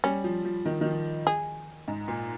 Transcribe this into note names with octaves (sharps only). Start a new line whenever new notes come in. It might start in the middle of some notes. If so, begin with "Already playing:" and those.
G3 C#4
F3
F3
D#3
D#3
F3
G#4
G#2
A#2